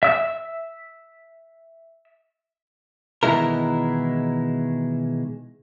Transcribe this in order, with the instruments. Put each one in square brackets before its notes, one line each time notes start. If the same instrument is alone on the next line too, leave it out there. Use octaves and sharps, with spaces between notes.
[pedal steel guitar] E5 E6
[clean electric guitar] B2 D#3 E3 G#3 E4 A#4